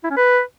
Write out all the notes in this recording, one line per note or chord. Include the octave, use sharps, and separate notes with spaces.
E4
C#4
B4